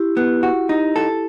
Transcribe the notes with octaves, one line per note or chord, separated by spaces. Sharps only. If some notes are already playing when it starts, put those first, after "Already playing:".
Already playing: E4 G4
B3
F#4
D#4
A4